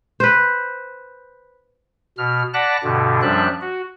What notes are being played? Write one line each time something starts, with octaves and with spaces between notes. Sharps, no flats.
B4 C5
B2 F6
D5 F#5 A5 B5 F#6 A#6
G2 B2 D3
F#2 F3 G3 D4 E5 F#6
F#4